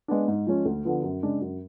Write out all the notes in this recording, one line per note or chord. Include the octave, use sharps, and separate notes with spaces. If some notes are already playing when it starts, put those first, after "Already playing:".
G#3 B3 D4
G#2
F3 G#3 C#4
D2
D3 F3 B3
F#2
C#3 G#3 D4
F#2